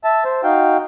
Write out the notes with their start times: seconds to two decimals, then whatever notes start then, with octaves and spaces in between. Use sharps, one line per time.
0.04 E5 A5
0.25 C5
0.43 D#4 F#4 F5 G5